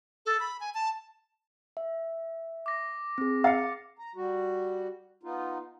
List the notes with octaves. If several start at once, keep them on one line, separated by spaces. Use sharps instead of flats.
A4
B5
G#5
A5
E5
D6 A#6
C4 G#4
F5 A6 C#7
A#5
G3 F#4
B3 D#4 F4